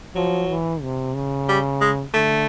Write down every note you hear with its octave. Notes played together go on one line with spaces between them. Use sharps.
F3 F#3
E3
C3
C#3
G3
G#3
D3 A3